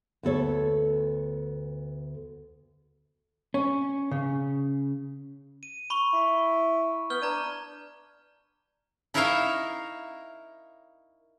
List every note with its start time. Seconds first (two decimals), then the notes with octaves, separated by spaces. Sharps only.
0.23 D2 B3 A4 C#5
3.54 C#4
4.11 C#3
5.63 D#7
5.90 B5 C#6
6.13 E4
7.10 B3 F6 G6 G7
7.22 D4 A#5 G#6 D#7
9.14 D#4 E4 A#4 C#5 E5 F5